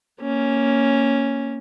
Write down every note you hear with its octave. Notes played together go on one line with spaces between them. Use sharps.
A#3 C#4